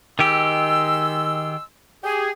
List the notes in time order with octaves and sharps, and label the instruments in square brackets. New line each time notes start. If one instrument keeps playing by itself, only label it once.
[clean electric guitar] D#3 G4 [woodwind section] G#3 C6 E6
[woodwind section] G4 G#4